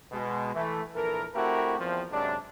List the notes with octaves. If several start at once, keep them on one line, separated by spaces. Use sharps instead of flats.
B2 G#3
E3 A3
A#1 E3 A4 A#4
A3 C4 E4 F#4 G4 A#4
E2 F3 C4
F#2 C3 G#3 D4